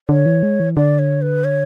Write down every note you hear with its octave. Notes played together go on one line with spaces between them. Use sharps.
D3 C#5
E3
G#3
E3
D3 D5
C#5
B4
C#5